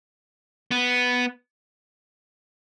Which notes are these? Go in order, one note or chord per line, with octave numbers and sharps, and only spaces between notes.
B3